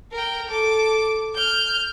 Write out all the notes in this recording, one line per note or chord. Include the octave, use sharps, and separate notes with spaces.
A#4 G5
A4 D6
F6 G6